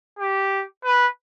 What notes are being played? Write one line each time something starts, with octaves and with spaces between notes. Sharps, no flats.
G4
B4